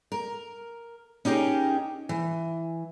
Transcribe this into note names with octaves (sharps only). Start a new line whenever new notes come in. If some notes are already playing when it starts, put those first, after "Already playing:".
A#4
C#4 D#4 G4 G#4 A#4
E3